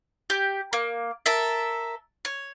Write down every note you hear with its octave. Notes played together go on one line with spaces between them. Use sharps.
G4
A#3
A4 A#4 E5
C#5